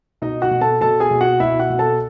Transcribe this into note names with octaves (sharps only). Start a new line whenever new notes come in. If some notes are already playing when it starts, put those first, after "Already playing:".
B2 D#4 D#5
F#4 F#5
B2
A4 A5
B2 A4 A5
G#4 G#5
B2
F#4 F#5
B2 E4 E5
F#4 F#5
B2
A4 A5